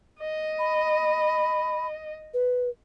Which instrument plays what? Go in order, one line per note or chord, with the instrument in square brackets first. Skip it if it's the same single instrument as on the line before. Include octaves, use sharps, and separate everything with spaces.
[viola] D#5
[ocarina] B5
B4